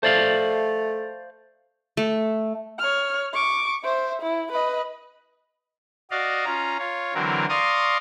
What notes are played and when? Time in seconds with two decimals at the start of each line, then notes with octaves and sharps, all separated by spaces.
0.03 A3 C5 D5 F5
1.97 A3
2.79 C#5 F6
3.33 C#6 D6
3.84 C5 E5
4.22 E4
4.52 B4 D#5
6.11 F#4 D5 D#5 F5
6.45 C#4 F4 A#5
6.79 F4 C#5
7.14 D3 E3 F#3 C4 A#4
7.49 D5 F5 A#5 C6 C#6 D#6